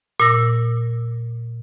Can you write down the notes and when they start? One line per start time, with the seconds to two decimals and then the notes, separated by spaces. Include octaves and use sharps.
0.20 A#2 D6 E6 A#6